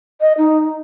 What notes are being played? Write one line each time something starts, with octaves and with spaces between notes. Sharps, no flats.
D#5
D#4